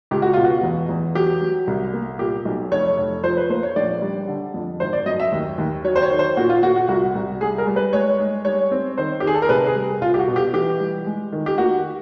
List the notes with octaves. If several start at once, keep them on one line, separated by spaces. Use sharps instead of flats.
C#2 G4
F#4
B2 F4
F#4
E2
E2
F#3 G4
F#3
C2
A#3
A#2 G4
B1
F1 C#5
F1
F3 C5
B4
A#3 C5
C#5
A#1 D5
G3
D3
F2
G#1 C5
D5
F#2 D#5
E5
D#2
D#2
F#3 C#5
C5
C#5
D#3
C5
A#2 F#4
F4
A#2 F#4
F#4
C2 F#4
C2
G3 G#4
A#4
G3
B4
G#3 C#5
G#3
G3 C#5
C4
D#3 C5
G4
D#3 G#4
A4
A#4
C3 B4
G#4
G3
C2 F4
G4
F#4
B2
G4
E3 G4
G3
G#3
D#3
G4
A#3 F#4